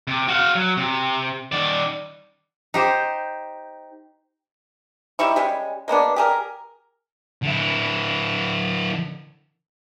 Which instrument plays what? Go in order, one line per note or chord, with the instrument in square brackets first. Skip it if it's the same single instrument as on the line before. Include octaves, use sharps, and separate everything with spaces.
[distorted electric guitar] C3
F#4 F5
F#3
C3
D#3 D5
[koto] D#4 G4 C5
[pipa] G3 D#4 E4 C#6
G3 G#3 C#4
G#3 A#3 B3 D4
G4 G#4 A#4
[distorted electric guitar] D3 E4